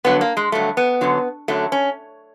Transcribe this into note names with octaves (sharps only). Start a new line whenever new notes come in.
G2 D3 F#3 B3
A#3
G#3
G2 D3 F#3 A3
B3
F#2 D3 F#3
F#2 D3 F#3 A3
C#4